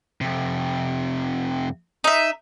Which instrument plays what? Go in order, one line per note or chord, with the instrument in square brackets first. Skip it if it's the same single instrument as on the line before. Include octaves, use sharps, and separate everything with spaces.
[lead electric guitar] F2 C3
[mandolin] D#4 E5